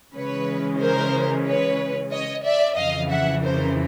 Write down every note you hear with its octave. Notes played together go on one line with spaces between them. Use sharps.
C#3 E3 G#3 C#4 B4 C#5
A#4 C5
B4 C#5
C#5 D#5
D5 E5
F2 C#3 E3 D#5 F5
E5 F#5
A#4 C5